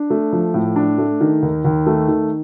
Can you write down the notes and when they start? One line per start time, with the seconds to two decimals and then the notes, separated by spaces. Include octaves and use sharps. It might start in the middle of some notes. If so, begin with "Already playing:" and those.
Already playing: D4
0.10 A3
0.33 F3
0.54 A2
0.76 D4
0.98 A3
1.21 D#3
1.42 D#2
1.65 D#2
1.86 A3
2.08 D#3